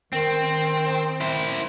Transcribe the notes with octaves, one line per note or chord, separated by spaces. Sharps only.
D#3 C4
E4 C5